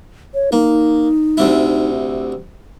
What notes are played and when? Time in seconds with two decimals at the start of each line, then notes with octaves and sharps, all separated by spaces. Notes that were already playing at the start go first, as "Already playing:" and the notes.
0.34 C#5
0.52 A#3 D#4
1.37 D2 C3 E4